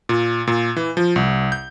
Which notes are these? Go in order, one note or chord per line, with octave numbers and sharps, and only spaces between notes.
A#2
A#2
E3
F3
C2
G6